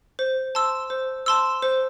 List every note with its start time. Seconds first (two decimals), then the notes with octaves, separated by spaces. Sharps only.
0.19 C5
0.55 A5 C6 E6
0.90 C5
1.26 A5 C6 E6
1.62 C5